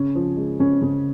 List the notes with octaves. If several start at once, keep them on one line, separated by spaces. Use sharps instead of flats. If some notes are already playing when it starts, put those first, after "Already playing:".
Already playing: C#3 C#4
F3
G#3
C#3 C#4
C#3